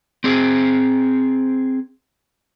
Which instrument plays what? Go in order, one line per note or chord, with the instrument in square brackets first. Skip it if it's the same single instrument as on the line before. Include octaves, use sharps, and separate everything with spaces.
[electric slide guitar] C4 G#4 C5